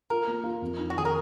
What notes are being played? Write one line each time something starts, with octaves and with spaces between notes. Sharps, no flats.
F4 A#4
A#3
F4
F2
D#4
F#4
D#3 G#4
A#4